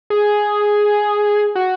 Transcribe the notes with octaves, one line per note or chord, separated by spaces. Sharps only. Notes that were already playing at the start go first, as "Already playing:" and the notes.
G#4
F#4